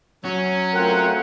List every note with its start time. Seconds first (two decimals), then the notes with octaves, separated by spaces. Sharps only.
0.25 F#3 C#4
0.74 A3 C4 F4 A#4 F#5